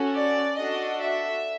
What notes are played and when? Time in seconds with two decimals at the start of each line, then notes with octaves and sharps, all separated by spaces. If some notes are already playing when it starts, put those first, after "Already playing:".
Already playing: C#4 F#4 A4
0.11 D5
0.56 D4 F#4 A4 D#5
1.01 E5